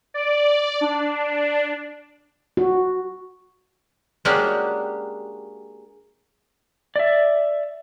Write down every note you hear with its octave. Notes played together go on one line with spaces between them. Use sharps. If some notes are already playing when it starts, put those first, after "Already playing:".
D5
D4
F#4
G#3 A#3 C#4 D4 F#4 G4
D5 E5